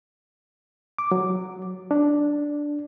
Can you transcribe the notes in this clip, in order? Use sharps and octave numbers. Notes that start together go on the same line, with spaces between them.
D6
F#3
D4